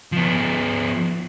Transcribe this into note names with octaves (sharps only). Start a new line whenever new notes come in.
F3 B3